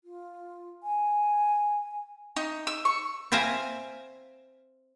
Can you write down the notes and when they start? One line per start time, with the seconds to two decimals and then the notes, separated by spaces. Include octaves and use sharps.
0.04 F4
0.83 G#5
2.36 D#4
2.67 E6
2.85 C#6
3.32 C4 C5 E5 F5 G#5 A#5